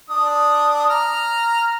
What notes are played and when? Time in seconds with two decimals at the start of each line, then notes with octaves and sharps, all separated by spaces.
0.10 D4 D#6
0.90 A#5 F6